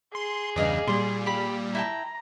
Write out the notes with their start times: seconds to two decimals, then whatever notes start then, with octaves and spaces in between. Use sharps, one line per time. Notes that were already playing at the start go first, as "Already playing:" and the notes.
0.15 G#4 C6
0.56 E2 G2 C#3 D5 D#5 F5
0.88 A#2 G3 C6
1.26 G4 B5
1.75 E4 G5 A5 A#5